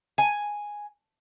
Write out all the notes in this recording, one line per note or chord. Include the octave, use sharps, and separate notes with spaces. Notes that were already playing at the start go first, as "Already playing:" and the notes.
G#5